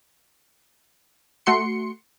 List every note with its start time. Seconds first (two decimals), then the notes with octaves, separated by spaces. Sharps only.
1.46 A3 F#4 C6 C#7